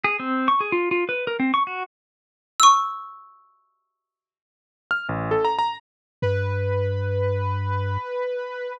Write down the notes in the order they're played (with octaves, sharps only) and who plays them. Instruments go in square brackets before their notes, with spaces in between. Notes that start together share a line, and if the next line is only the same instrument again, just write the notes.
[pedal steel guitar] G#4
C4
C#6
G#4
F4
F4
B4
A#4
C4
C#6
F#4
[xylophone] C#6 E6
[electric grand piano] F6
A1
A4
A#5
A#5
[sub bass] G2 [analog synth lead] B4